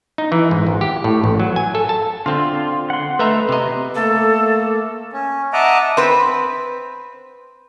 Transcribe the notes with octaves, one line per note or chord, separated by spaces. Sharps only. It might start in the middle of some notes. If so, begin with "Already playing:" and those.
D#4
E3
G#2
G#1
G4
A2
A1
F#3
G#5
A4
A5
D3 C4 F4
F#5 C6
A3 B4 D#5 E5 A#5 C6
C3 D#5
A3 A#3 A4
C#4
D#5 E5 F#5 A5 A#5 D6
C4 B4